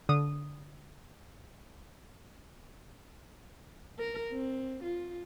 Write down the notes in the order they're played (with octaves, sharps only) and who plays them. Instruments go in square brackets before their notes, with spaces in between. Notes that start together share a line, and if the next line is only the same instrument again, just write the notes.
[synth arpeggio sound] D3 D#6
[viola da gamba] A#4
C4
F4